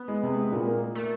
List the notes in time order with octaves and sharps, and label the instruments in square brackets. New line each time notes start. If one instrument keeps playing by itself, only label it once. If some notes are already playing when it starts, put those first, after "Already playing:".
Already playing: [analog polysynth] B3
[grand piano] G#3
C3
G#3
A#2
A#3
A#3
[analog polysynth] A3 [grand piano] A#3